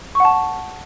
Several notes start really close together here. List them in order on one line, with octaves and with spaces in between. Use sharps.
C#6 F#5 A5